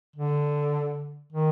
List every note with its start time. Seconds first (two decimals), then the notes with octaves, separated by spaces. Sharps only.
0.16 D3
1.33 D#3